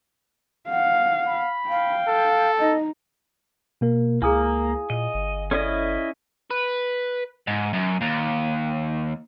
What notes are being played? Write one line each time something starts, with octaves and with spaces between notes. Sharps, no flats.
F5 F#5
B5
F5 G5
A4
D#4 D#5
B2 A#3 A#4
C#2 A#3 E4 G#4 F5 G#5 D#6
A#2 D#5
G1
C#4 E4 A4 D5 D#5
B4
G#2
F#2
D#2